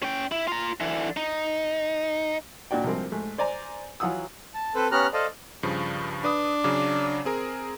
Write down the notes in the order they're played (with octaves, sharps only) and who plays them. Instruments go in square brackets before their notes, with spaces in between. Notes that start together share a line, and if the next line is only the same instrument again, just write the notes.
[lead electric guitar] C#4 G5
E4
F4 A#5
D3 E3
D#4
[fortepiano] A#2 D4 F#4 D5 G5
C2 G#2 F3 A#3 C4
G#2 A3
C5 D5 G#5 A#5
E3 F#3 F4 F#5 D#6 E6
[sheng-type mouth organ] A5
C4 A4 B4 C5
B3 C#4 G4 A#5 F6 F#6
A4 C5 D5 D#5 F5 A5
[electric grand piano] G2 C#3 F3
[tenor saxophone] D4 [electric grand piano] B4 D#6
[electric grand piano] C#3 F#3 D6
C4 G#4 A#4